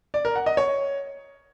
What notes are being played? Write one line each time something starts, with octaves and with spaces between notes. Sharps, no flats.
D5
A#4
F#5
D#5
C#5